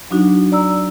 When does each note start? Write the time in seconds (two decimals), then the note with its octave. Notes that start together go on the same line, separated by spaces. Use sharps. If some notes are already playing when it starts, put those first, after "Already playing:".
0.11 F#3 D4 D#4 F#4
0.52 D5 A#5 E6